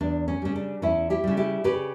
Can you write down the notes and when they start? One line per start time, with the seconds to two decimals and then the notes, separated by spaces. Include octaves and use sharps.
0.01 E2 D4
0.28 C#4
0.42 C#3 G3 C#4
0.56 D4
0.82 E2 C#4 E4
1.10 E4 G4
1.24 C#3 G3
1.37 E4 G4
1.64 C#3 G4 B4